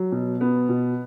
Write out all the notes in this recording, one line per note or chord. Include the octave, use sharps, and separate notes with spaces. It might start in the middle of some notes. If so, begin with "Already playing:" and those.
Already playing: F#3
B2
B3
B2